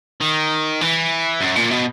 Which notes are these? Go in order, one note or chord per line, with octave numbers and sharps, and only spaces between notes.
D#3
E3
F#2
A#2
B2